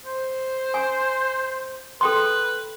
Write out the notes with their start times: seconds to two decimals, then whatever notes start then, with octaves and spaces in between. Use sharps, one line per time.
0.05 C5
0.74 G#5
2.01 A4 B4 G5 C6